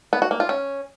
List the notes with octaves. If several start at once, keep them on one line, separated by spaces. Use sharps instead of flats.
B3
F#4
A#3
F4
C#4